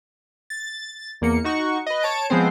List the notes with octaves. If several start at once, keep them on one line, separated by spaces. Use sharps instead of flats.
A6
E2 A#3 C#7
D#4 F#4 C#6
B4 D#5
C#5 A5 D7
F3 G#3 B3 C4 C5